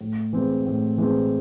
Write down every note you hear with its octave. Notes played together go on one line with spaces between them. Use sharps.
A2
E3 G#3 C4
A2
E3 G#3 C4